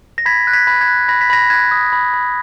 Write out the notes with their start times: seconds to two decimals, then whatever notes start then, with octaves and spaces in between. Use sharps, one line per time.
0.18 A#6
0.26 B5 G#6 B6
0.47 F#6
0.53 G#6 B6
0.67 B5
0.81 G#6
0.88 F#6
1.08 B5 A#6
1.21 B6
1.30 B5 A#6
1.50 F#6 G#6
1.71 D#6
1.92 B5
2.14 B5